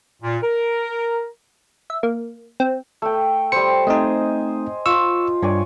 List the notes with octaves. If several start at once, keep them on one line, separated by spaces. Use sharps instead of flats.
A#2
A#4
E5
A#3
C4
A3 G5
G3 C5 C#7
A3 C4 D#4 D#5 G#5
F4 C#6 E6
G2 C#5 D5 G#5